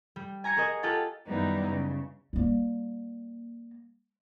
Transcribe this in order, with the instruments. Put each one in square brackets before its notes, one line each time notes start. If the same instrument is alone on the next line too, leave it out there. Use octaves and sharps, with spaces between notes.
[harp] G3
G#5 A#5 G#6 C#7
F#4 G#4 A#4 D#5
F4 G4 A4 F#5 A5
[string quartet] F#2 D#3 G3 B3 D#4 E4
C#3
[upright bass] G3 A#3